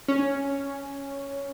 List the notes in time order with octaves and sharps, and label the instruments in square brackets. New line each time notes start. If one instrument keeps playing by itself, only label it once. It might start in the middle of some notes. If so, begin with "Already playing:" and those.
[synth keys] C#4